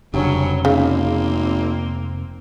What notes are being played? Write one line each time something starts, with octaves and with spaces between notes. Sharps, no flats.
F1 G2 C#3 F#3 C#4
G#1 C#3 A#3 C4